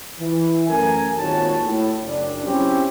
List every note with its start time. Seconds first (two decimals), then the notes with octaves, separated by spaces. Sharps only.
0.19 E3
0.68 F#2 A3 A#4 G#5
1.17 G#1 D#2 A#2 F#4 C#5 A5
1.63 A2
2.01 F#1 D4
2.46 F#3 C4 C#4 E4 G4